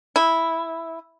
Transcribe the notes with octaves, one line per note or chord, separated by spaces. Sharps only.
E4